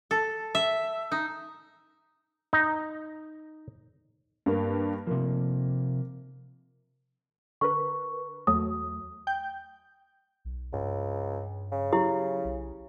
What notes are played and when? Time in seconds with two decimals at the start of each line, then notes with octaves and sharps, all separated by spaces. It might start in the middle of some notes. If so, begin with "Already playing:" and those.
0.11 A4
0.55 E5
1.12 D#4
2.53 D#4
4.46 G2 A#3
5.07 C3 F3 A#3
7.61 D3 A#4 B4 C#6
8.47 E2 F#3 A3 D#6
9.27 G5 G6
10.45 B1
10.73 C#2 G2
11.72 C#3
11.93 F#3 E4 G4
12.45 B1